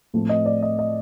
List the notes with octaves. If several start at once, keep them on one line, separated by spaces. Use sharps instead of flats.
A2 F3 A3 C4
D#5
D5
D#5
D#5